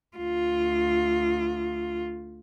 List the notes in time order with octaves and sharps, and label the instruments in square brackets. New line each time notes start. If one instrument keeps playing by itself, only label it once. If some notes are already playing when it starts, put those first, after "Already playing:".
[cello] D2 F4